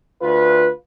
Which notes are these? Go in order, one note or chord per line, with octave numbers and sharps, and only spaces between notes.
D2 F4 B4